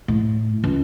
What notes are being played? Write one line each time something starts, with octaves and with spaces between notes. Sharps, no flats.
A2
C#2